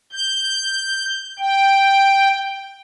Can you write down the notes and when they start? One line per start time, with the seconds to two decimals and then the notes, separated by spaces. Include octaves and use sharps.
0.12 G6
1.39 G5